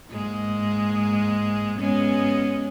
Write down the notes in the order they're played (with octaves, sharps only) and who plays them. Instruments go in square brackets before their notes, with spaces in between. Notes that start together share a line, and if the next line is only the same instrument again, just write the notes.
[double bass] G#2 [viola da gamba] G#3 A#3
[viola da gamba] G#3 B3 C#4